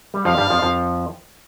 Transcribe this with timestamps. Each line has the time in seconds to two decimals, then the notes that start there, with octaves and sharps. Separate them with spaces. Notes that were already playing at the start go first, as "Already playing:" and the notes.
0.14 G3
0.25 F2 F3 F5
0.38 G2 G3
0.50 F2 F3
0.62 F2 F3